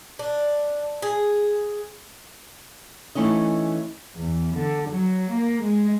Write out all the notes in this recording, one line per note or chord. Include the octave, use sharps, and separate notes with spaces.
D4
G#4
E3 A3 C#4 D#4 D#5
E2
D3
F#3
A#3
G#3